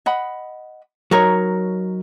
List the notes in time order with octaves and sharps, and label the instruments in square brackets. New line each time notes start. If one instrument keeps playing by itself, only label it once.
[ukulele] D#5 F#5 B5
[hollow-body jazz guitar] F#3 [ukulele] D#4 A#4 C#5